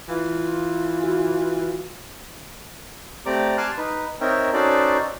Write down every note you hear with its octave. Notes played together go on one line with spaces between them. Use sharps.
E3 F4
F#4
A3 C4 G4 D5 A#5 D6
G#5 A5 C6 D6 F6 F#6
D#4 B4
C4 D#4 A#4 C#5 E5 G5
C#4 D#4 F#4 A4 C5 D5